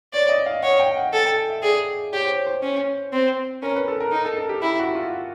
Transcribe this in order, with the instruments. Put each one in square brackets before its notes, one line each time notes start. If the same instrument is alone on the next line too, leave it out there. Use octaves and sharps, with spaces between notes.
[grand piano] C#5 [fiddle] D5
[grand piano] D#5
F5
[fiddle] C#5 [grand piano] F#5
[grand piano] G5
F#5
[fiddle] A4 [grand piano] G#5
[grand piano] G5
E5
[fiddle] G#4 [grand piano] D5
[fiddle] G4 [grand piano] C#5
[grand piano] C5
C#5
C5
[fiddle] C#4
C4
[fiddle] C#4 [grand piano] A#4
[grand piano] B4
A4
A#4
[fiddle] D#4 [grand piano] A#4
[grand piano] A4
A4
G4
[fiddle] E4 [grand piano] G4
[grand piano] F#4
F4